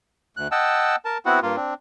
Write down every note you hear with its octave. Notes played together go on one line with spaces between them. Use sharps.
D2 F#6
D#5 F#5 G5 A5 E6
A#4 A5
B3 C4 E4 F#4 F#5
G2 A#3 F4
C4 D4